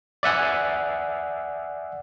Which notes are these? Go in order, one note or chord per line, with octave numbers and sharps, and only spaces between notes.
D5 E5 F#5 G#5